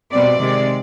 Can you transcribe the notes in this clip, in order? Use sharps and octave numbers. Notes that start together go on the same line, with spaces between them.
B2 G3 C4 D5
C3 D#3 G#3